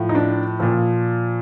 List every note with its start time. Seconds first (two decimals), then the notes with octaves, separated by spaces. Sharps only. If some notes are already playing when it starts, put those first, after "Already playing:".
Already playing: A2 F3
0.09 D#4
0.15 D4
0.60 A#2 F3